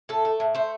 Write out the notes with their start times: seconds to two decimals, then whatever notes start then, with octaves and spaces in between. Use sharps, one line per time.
0.09 A2 A4
0.25 A3
0.40 A2
0.55 A3 C5